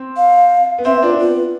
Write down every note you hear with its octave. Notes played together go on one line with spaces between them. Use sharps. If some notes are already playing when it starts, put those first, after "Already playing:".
Already playing: C4
F5
B3
C4 E5
D4 F4
B3
F4